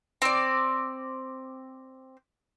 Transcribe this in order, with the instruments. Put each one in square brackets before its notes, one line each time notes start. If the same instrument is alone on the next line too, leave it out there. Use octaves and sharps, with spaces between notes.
[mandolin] C4 D5